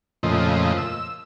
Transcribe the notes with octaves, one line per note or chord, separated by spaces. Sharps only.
F2 A#2 C#3 F3 A3 D#5
E6